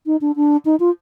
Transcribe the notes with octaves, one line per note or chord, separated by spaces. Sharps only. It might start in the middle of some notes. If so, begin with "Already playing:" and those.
D#4
D4
D4
D#4
F4